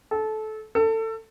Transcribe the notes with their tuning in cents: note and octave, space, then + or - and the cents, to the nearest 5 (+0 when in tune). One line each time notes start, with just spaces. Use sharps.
A4 -20
A4 +25